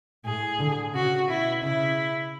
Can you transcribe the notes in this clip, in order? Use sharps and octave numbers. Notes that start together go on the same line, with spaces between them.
A2 G#4
D3
C#3 F#4
B2 E4
C#3 E4